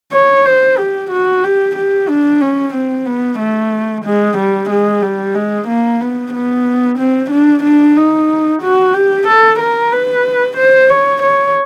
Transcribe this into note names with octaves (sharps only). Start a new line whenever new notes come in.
C#5
C5
G4
F#4
G4
G4
D4
C#4
C4
B3
A3
G#3
G3
G#3
G3
G#3
A#3
B3
B3
C4
D4
D4
D#4
F#4
G4
A4
A#4
B4
C5
C#5
C#5